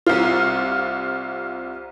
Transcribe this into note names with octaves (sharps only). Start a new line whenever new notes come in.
C2 F4